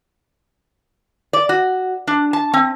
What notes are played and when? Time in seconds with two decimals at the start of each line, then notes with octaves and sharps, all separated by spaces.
1.33 D5
1.49 F#4
2.07 D4
2.33 A5
2.54 C4